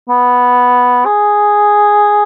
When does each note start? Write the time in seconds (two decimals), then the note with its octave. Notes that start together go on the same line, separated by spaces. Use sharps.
0.09 B3
1.05 G#4